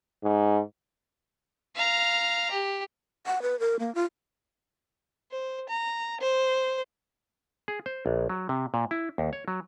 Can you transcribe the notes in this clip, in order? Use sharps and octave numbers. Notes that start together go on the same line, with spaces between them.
G#2
F5 A#5
G4
F#5
B4
A#4
A#3
F4
C5
A#5
C5
G#4
C5
A#1
F#3
C3
A#2
E4
D#2
C#5
F#3